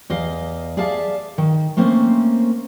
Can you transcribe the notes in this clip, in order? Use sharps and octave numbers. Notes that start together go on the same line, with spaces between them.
E2 D#5 F5
G#4 D5 E5 F5 A5
D#3
A3 A#3 C4 C#4 C5